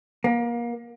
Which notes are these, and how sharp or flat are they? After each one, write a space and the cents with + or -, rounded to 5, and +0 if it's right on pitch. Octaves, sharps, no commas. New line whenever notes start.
A#3 +30